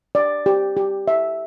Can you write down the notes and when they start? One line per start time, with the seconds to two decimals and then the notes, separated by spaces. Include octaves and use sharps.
0.15 D5
0.46 G4
0.77 G4
1.08 E5